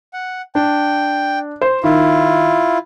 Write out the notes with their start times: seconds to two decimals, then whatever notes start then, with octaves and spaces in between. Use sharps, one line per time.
0.14 F#5
0.55 D4 G5
1.61 C5
1.83 D#3 E4 F4